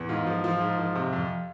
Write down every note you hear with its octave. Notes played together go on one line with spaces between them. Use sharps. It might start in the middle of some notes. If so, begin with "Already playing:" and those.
Already playing: E2
G#2 F4
F3
F3 F4
G#2
F3
C3
F2